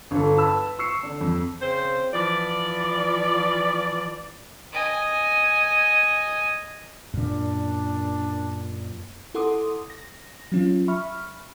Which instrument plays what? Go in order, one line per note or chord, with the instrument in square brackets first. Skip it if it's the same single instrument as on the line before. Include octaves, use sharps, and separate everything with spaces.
[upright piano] G1 A4
B4 A5 B5 E6
C#6 E6 C7 C#7
D3 D4
F2
[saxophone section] C#3 C4 C5
E3 F3 D5
[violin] D#5 G#5
[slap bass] F#2 A#2 [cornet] D4
[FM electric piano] E4 A4 F#5 C6 D6 D#6
A#6
F#3 C#4 F4
E5 B5 C#6 F6